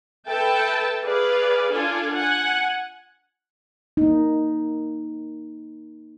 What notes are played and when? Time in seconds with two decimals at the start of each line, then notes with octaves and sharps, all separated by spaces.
0.29 A4 B4 E5 G5 A5
1.04 G#4 B4 D5 F5
1.70 D4 F4 A4 G#5
2.14 F#5 G#5
3.97 A#3 D#4